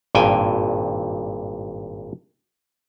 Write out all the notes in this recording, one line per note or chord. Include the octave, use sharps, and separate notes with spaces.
G#1 G2 A#2 G5 G#5